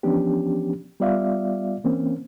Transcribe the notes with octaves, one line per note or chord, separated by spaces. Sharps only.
E3 F3 B3 C#4 D4 G4
G3 B3 F4 D5 E5 F5
E3 A#3 C4 C#4